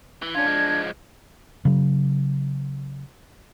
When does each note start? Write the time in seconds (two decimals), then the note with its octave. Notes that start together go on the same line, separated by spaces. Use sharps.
0.22 E3
0.35 C#4 D4 F4 G#6
0.46 F3 G#3
1.65 C#3 F#3